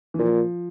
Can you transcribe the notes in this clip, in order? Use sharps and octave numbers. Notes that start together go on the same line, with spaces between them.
E3
A#2 F3